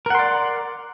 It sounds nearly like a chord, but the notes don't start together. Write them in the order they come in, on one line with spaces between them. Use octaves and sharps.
A#4 F#5 C6 D5